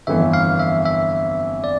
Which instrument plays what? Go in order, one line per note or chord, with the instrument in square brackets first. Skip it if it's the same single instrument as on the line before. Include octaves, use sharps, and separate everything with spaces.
[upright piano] G1 F2 E3 [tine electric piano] E5
[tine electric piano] F5
E5
E5
D5